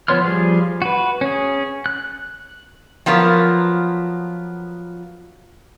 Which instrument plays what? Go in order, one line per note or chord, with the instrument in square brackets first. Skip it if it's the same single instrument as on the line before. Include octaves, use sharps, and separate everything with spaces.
[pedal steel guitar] F3 B3 C#5 C6 F6
F3 G3 G#4
F#4 B4
C#4 G#4
F#6
[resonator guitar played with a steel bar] F3 F#3 B3 F4 A#4